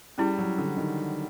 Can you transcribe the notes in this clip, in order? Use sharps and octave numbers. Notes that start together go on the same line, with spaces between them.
G3 C#4 E4 G#4
F#3
D3
D#3